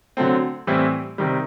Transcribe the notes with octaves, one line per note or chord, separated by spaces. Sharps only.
D3 F#3 A3 C4
A2 E3 G3 C4 E4
C3 D#3 G3